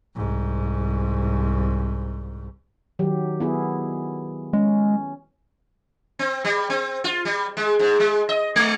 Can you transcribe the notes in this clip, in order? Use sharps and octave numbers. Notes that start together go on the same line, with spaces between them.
C2 G#2
D#3 F#3 G4
B3 E4 G#4
G#3 C#4
C4
G3
C4
F4
G3
G#3
G#2
G#3
D#5
G#3